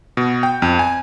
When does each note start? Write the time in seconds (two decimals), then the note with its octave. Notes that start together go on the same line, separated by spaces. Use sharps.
0.17 B2
0.43 G5
0.62 F2
0.79 G#5